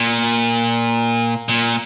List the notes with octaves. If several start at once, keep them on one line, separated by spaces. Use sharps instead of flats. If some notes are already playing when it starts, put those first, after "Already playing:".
Already playing: A#2
A#2